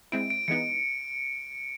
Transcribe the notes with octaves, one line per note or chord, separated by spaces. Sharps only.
G#3 C4 E4 D7
D7
E3 G#3 B3 D#4 C#7